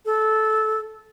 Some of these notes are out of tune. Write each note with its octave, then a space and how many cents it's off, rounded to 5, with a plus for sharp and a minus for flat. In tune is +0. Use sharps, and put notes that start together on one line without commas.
A4 -15